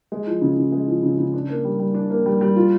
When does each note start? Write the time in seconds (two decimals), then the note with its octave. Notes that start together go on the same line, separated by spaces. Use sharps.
0.12 G#3
0.27 F3
0.42 C#3
0.57 C#3
0.72 G#3
0.88 F3
1.03 C#3
1.18 C#3
1.34 D4
1.49 A#3
1.65 G3
1.79 G3
1.94 D4
2.10 A#3
2.26 G3
2.41 G3
2.56 F4